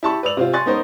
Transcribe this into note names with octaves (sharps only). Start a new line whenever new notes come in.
E4 G4 A5 B5 C#6
B4 D5 E6 F7 F#7
C3 C4 F4
G#5 C6 C#6 F#6 A6
B3 C#4 D#4 A#4 C5 C#5